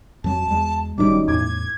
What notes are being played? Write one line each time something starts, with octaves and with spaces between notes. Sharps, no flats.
F2 F#3 A5
E2 G#3
D1 F#2 D#3 G3 D#4 D6
E2 A2 D6 G#6